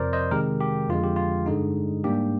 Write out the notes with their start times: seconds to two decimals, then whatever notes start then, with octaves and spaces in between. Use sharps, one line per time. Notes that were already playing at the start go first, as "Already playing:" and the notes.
Already playing: F2 C3 F3 A#4 C5 D5
0.13 C5 D#5
0.31 C3 D#3 G#3 G4 A#4
0.61 G4
0.89 F2 D3 F3 G#3 F4
1.04 G4
1.16 F4
1.46 G2 D3 G#3 D#4
2.04 G#2 G3 A#3 D4 G4